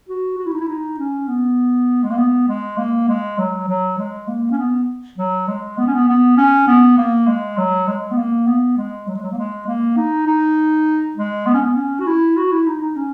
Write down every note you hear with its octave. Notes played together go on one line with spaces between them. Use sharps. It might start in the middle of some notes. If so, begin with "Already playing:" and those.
F#4
F#4
E4
D#4
E4
D#4
C#4
B3
G#3
A#3
B3
G#3
A#3
G#3
F#3
F#3
G#3
A#3
C#4
B3
F#3
G#3
B3
C#4
B3
B3
C#4
B3
A#3
G#3
F#3
G#3
B3
A#3
B3
G#3
F#3
G#3
F#3
A#3
G#3
A#3
D#4
D#4
G#3
B3
C#4
B3
C#4
F#4
E4
F#4
E4
D#4
D#4
C#4